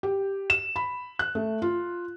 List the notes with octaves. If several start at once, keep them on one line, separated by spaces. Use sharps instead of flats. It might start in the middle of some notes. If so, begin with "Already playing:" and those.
G4
E7
B5
F#6
A3
F4